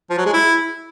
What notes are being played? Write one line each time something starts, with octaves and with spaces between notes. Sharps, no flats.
F3
F#3
G#3
E4